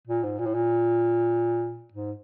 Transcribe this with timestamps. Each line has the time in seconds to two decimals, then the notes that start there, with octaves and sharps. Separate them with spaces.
0.08 A#2
0.23 G#2
0.39 A#2
0.46 A2
0.54 A#2
1.93 G#2